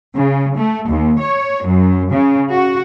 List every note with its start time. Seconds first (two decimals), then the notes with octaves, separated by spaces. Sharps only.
0.16 C#3
0.56 A3
0.88 D#2
1.21 C#5
1.66 F#2
2.12 C#3
2.52 F#4